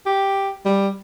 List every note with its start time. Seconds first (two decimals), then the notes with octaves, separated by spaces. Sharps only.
0.06 G4
0.65 G3